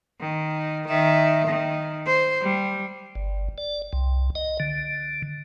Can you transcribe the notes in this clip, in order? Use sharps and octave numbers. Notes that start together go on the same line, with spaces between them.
D#3
D#3 E5
D#3
C5
G3
G1
D5
C2
D#5
D3